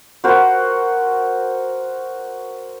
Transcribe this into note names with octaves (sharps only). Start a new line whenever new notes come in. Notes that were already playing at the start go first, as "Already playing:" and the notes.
F#4 A#4 C5